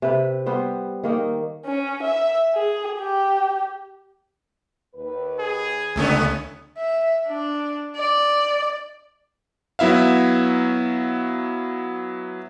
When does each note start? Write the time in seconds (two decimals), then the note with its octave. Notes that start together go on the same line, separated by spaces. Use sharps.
0.02 C3 B4
0.46 G3 B3 C5
1.03 D#3 A#3 D#4
1.65 C#4
2.03 E5
2.55 G#4
2.99 G4
4.95 D#2 B4
5.40 G#4
5.96 C#2 G2 D3 A3 B3 C#4
6.78 E5
7.28 D4
7.96 D5
9.79 F#3 B3 E4 E5 F5